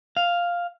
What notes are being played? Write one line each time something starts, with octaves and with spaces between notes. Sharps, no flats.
F5